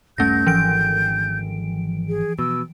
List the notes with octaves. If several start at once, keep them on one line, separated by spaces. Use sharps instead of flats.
D#1 G2 A3 C#4 G6 A#6
G#1 E3 F3 D7
G#4
B2 E6